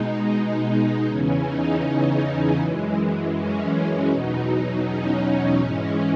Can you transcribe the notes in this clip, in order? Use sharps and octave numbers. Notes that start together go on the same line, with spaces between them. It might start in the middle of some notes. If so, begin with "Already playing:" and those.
Already playing: B2 G#3 D#4
E2 C#3 E3 C#4
D#4
F#2 E3 G#3
C#4
E2 B2 F#3 D#4
C#4
G#2 E3 G#3